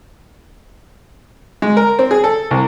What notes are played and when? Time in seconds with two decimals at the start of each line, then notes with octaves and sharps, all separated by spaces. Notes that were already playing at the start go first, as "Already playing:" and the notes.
1.62 G#3
1.77 A#4
1.99 C4
2.11 G#4
2.24 A4
2.51 C2